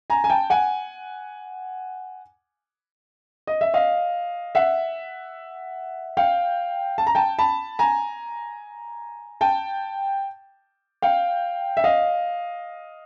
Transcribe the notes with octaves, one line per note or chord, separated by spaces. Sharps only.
G#5 A#5
G#5
G5 A5
F#5 G#5
D#5
E5
D#5 F5
E5 F#5
F5 G5
A5
A#5
G5 A5
A5 B5
G#5 A#5
G5 A5
F5 G5
E5
D#5 F5